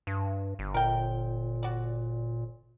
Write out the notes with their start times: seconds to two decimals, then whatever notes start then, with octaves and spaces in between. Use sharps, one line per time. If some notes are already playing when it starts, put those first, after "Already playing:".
0.07 G2
0.59 G1
0.74 A#2 A#4 G5
1.63 F#4 D5